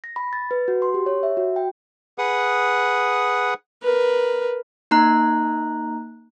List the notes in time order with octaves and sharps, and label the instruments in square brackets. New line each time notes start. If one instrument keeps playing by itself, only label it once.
[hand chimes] A#6
B5
A6
B4
F#4
C6
G4
C#5
E5
F#4
G5
[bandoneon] G#4 B4 F#5 D#6
[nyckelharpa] A#4 B4
[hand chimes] A#3 D#4 A#5 F#6